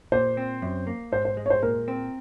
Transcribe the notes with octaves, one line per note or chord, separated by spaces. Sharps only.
A#2 C5
C4
F#2
A#3
G#2 C5
C5
G#3
C#5
C5
A#2 A#4
C4